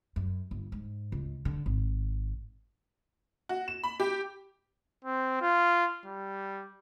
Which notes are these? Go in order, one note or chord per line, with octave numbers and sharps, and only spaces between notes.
F#2
G1
G#2
C#2
D3
G#1
F#4
E7
B5
G4
C4
F4
G3